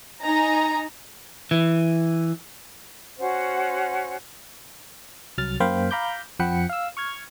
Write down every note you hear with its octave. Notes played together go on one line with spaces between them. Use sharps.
D#4 G#5 A#5
E3
C#4 F#4 C5 F#5
C2 F#3 F6 A6
F#2 A#3 C5 F5 G5 B5
F5 A#5 B5 D6 G6
F2 F3 F#5 G5 B5 C#7
F5 E6
C#6 F6 G#6